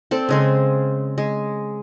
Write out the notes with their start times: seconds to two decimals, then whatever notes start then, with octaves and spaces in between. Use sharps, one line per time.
0.11 C4 A4 D5
0.29 C#3 G#3 C4
1.18 G#3